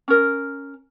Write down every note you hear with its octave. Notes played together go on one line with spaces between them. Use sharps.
C#4 A#4